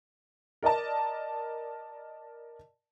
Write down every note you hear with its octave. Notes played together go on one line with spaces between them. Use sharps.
A#4 D5 D#5 A5